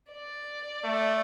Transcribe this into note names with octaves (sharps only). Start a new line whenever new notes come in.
D5
A3